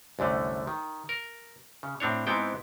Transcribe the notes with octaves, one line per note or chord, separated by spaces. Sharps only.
C2 F#2 D3 A3
D#3
A#4
C#3
A2 C4 D4 C#5
G#2 B3 C4 E4 G5